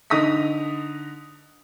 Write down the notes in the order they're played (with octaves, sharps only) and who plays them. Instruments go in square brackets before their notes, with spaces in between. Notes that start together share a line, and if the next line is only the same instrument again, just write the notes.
[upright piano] D3 D#4 D#6 A#6 B6